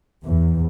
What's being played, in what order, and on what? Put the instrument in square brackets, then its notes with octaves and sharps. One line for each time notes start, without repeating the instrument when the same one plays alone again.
[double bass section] E2